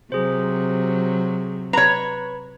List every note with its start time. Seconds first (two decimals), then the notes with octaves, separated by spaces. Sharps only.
0.12 C3 F#3 G#4 C5
1.73 B4 C#5 A#5 B5